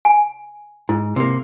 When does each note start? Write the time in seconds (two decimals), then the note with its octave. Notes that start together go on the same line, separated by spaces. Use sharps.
0.05 G#5
0.89 G#2 E4
1.16 C3 A#3